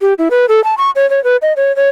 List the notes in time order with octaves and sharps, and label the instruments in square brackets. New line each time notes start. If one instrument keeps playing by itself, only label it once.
[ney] G4
E4
B4
A4
A5
C#6
C#5
C#5
B4
D#5
C#5
C#5